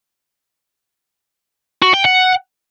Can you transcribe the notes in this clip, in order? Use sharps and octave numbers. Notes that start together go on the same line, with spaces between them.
F#4
G5
F#5